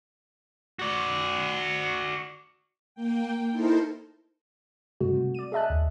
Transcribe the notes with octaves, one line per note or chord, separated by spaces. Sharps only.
F#4 D5
A#3 G5
D#4 E4 A4 A#4 C5
G2 C3 G#3 A3 F#4
C3
D5 D#7
G#4 D#5 E5 A5 F#6
D#2